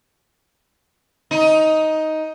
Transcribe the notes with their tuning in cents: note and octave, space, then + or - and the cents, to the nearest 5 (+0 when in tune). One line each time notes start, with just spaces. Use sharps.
D#4 +10